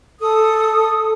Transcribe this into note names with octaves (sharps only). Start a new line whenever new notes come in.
A4 D#6